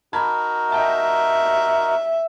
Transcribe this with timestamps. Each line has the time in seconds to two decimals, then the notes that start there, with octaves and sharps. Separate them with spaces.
0.13 D#4 F#4 A#4 A5 B5 G#6
0.72 D#5 E5 G5 A5